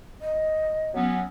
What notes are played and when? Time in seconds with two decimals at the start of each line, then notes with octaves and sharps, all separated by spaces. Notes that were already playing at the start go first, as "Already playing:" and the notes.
0.21 D#5
0.94 F#3 B3 C#4